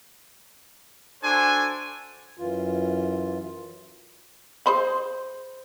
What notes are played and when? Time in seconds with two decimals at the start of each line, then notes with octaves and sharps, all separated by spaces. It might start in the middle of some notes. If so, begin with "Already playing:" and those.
1.23 D4 F#4 A4 C5 G#5
2.37 F#2 E3 F4
4.66 G#4 C5 B5